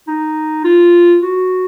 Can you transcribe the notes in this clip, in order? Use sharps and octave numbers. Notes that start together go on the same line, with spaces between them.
D#4
F4
F#4